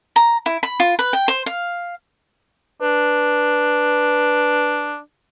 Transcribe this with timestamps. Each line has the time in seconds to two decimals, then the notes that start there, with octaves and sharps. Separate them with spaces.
0.16 A#5
0.46 E4
0.63 B5
0.80 F4
0.99 B4
1.13 G5
1.28 C5
1.46 F5
2.82 D4 B4